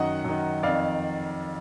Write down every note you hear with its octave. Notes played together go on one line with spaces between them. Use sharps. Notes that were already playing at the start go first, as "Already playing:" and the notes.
Already playing: F#2 D#3 D#5 F#5
F#2 D#3
F2 D#3 D5 F5